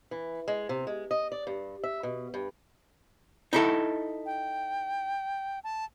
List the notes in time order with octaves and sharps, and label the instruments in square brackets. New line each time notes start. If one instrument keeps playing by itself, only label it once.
[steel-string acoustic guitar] E3
G#3
C3
G#3
D#5
D5
G2
E5
B2
G2
[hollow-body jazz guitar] D#4 E4 A4
[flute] G5
A5